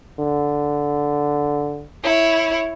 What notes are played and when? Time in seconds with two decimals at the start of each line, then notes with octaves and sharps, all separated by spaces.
0.20 D3
2.03 E4 C#5